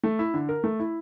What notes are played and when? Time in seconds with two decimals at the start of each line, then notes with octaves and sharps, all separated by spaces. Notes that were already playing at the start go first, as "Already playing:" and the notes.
0.04 A3
0.19 E4
0.34 D3
0.49 A#4
0.64 A3
0.80 E4